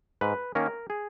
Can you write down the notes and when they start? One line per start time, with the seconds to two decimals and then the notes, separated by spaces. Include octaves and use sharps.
0.21 G#2 B4
0.55 D#3 A#3 C#4 A#4
0.90 G#4